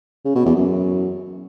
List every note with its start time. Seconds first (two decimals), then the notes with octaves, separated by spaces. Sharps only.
0.25 C#3
0.35 B2
0.45 E2
0.56 F#2